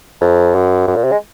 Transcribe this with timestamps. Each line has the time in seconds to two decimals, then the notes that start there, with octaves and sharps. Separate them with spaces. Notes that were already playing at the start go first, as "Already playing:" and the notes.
0.21 F2
0.55 F#2
0.87 F#2
0.96 A#2
1.04 C3
1.12 G#3